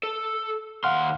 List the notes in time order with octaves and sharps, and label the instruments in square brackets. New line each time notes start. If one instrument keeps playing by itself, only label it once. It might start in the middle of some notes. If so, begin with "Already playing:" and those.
[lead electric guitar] A4
[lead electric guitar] D#2 C6 [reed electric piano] F5 F#5 F6